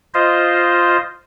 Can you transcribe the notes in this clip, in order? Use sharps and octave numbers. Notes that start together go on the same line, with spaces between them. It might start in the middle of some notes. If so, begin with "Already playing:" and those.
F4 C5 D#5